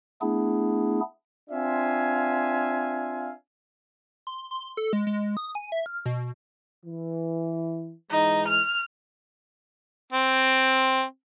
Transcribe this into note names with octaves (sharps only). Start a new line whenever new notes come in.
A3 B3 D4 E4 G#4
C4 D4 F4 E5 F5 G#5
C6
C6
A4
G#3
G#3
D#6
G#5
E5
F6
B2
E3
G#2 E3 G#3 D#4
F6
C4